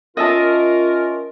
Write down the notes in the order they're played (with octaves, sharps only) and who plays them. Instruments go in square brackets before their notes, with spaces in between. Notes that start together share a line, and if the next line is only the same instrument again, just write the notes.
[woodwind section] C#4 F4 A#4 [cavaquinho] D#5 E5 A5